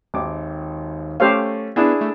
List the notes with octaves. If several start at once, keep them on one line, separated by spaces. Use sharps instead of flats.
G#1 D#2 D6
A3 C#4 G4 C5 F5
B3 D4 E4 G#4
A3